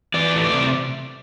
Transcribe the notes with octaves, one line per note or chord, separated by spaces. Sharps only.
E3 D5
A3
D5
C3